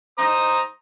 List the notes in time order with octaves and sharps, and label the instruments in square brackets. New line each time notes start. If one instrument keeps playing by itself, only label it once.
[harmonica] C5 A#5 D#6